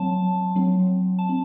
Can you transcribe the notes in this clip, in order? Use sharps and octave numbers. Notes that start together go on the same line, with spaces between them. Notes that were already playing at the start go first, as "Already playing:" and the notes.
Already playing: F#3 C4 A5
F#3 C4
A5
C4